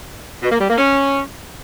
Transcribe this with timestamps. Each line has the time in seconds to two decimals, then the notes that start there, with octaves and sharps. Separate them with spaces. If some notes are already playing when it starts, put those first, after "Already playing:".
0.43 B2
0.52 A#3
0.61 G3
0.69 A#3
0.78 C#4